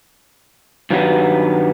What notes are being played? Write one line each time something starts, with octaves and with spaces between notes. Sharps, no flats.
G2 D#3 F#3 G3 B3